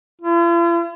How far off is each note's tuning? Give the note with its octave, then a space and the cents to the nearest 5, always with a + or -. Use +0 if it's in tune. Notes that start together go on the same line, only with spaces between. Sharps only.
F4 -45